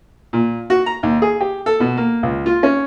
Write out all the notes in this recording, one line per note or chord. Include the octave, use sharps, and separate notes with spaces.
A#2
F#4
A#5
D#2
G#4
G4
A4
B2
A#3
C#2
F4
C#4